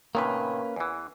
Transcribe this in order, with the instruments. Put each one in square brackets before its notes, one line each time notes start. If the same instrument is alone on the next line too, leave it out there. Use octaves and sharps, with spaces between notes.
[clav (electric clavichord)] A2 C3 D#3 [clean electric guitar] A#3 C#4 B4
[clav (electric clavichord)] E2 E3